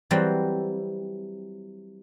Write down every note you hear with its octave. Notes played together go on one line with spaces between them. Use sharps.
E3 F#3 G3 C4